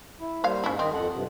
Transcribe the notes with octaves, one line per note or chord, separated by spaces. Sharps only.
E4
G3 A#3 C5 C#5 F5
G#2 C#4 E4
D#3 C4 D#5
F2 A4 F#5
G2 C3